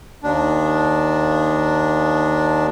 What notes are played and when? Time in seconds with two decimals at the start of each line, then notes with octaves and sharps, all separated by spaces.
0.23 D#2 D4